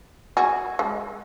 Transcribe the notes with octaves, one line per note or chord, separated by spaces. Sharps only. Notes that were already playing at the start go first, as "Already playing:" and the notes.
F#4 G#4
G#3